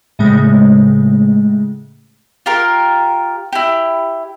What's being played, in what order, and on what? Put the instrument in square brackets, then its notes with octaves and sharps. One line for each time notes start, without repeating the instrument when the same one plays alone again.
[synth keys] A2 C#3 G#3 A3
[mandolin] F4 G4 A#4
E4 G4